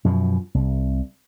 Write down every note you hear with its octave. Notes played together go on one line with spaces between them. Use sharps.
F#2 B2 F3
C2